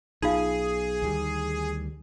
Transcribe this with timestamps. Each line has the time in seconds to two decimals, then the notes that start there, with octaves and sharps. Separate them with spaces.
0.22 B1 D#4 F4 G#4 F5
1.02 D2 D#3 G3